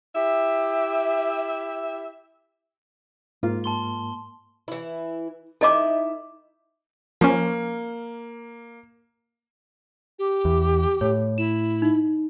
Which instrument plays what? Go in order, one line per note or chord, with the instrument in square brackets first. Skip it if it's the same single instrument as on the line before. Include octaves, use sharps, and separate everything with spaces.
[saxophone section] E4 G4 E5
[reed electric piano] G#2 A#3 [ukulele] F4
[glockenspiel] A5 C6 G7
[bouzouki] E3 E4
[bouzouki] D#4 E4 E5 [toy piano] A4 D#5 D6
[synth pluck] F3 C#4 [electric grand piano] A#3
[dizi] G4
[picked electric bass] E2
[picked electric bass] A2 [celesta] C#5
[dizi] E4 [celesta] E7
[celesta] D#4